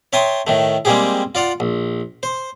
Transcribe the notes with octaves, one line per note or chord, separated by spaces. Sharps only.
C#5 E5 G5 A5 C6 D#6
A2 D#3 A3
G3 G#3 A#3 C4 G4 G#4
F4 D5 F5 F#5
A#1
C5